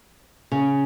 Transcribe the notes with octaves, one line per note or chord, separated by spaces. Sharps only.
C#3